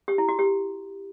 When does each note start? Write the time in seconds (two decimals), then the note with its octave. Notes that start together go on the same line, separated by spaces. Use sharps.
0.08 G4
0.18 E4
0.29 F#4
0.39 G4